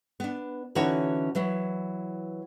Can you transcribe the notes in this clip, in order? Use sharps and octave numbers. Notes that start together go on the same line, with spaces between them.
B3 D4
D3 E3 C#4 D#4 F#4 C#5
E3 F#3 E4